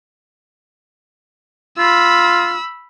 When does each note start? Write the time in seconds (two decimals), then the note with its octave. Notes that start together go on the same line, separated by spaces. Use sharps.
1.78 F4 B5 E6